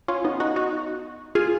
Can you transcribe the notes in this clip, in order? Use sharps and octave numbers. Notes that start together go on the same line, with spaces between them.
C#4 F4
B3 D#4
D#4 F#4
D#4 F#4
F4 G#4